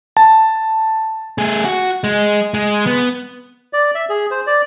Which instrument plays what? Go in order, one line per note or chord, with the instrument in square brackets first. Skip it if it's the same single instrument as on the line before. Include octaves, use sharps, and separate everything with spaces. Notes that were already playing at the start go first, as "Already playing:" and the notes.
[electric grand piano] A5
[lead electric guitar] A3 G#4
F#4
G#3
G#3
B3
[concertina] D5
E5
G#4
C5
D5